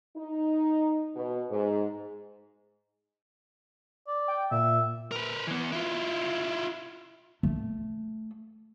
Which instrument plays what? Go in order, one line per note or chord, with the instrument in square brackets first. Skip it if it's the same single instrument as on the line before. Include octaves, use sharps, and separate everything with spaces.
[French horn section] D#4
B2
G#2
[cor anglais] D5
[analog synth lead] G5
[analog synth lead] A#2 [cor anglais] E5
[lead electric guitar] A#4 B4
E3 B3
E4 F4
[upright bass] A3